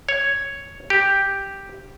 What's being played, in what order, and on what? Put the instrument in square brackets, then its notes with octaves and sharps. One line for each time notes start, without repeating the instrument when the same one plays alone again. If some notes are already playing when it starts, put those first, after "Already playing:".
[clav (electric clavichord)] C#5
G4